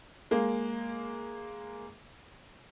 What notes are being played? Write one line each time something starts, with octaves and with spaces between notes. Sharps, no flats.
G#3 A#3